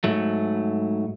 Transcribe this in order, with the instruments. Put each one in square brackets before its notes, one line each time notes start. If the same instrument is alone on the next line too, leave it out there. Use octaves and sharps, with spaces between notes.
[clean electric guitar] G#2 F#3 A3